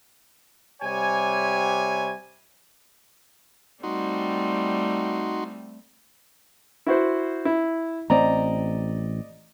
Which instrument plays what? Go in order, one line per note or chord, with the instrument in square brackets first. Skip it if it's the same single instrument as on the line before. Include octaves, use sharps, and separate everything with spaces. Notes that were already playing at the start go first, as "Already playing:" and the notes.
[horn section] C3 G3 C#5 G#5
[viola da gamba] G3 A3 C4 [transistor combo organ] D#4 F#4 C6
[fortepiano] E4 F#4 C5
E4
[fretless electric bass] A1 C4 [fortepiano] D5 D#5 A#5